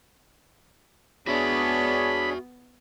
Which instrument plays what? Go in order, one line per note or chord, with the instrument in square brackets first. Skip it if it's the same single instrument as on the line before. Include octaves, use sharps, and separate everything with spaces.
[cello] B3 [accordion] D4 G#4 C#5 [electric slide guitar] F#4 E5 [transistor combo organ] B5